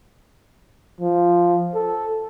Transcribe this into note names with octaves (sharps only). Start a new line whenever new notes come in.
F3
A4